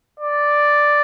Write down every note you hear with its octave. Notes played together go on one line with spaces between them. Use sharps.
D5